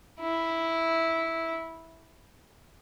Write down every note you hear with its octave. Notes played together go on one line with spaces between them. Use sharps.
E4